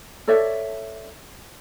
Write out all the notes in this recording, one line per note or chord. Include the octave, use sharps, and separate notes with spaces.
A4 C#5 D5 E5